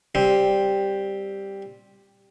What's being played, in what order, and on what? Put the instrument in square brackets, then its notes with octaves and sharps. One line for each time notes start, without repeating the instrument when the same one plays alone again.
[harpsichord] G3 C4